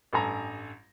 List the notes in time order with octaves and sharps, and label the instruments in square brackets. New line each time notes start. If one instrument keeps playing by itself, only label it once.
[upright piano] A1 G2 A4 G#5 A#5